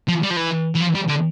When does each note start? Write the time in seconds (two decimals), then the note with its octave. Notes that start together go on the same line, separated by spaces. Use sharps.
0.08 F3
0.23 G3
0.30 F3
0.37 E3
0.75 E3
0.80 F3
0.94 G3
1.09 D3